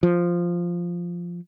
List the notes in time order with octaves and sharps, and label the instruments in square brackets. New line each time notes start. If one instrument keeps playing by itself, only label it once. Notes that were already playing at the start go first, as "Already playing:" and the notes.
[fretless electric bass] F3